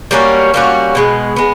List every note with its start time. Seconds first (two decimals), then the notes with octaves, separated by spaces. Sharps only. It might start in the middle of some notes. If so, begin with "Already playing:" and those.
0.11 G3 A#3 C#4 F#4
0.54 G3 A#3 C#4 F#4
0.95 B2 G#3 B3
1.36 G#3 B3